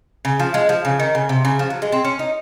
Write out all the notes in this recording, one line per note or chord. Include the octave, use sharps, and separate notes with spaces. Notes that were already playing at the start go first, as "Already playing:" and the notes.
C#3
F3
G#3
F3
C#3
D#3
C#3
C3
C#3
F3
F#3
G#3
C4
C#4
D#4